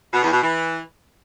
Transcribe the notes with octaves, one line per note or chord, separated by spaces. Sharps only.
B2
E2
B2
E3